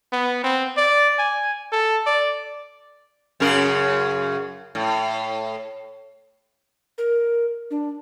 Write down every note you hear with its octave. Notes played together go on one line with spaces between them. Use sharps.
B3
C4
D5
G#5
A4
D5
F#2 C#3 A#4
A2
A#4
D4